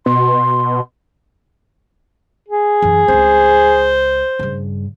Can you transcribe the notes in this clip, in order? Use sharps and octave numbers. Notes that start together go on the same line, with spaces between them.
B2 C6
G#4
F#2 E3
C#2 C4 C5
G2 C#3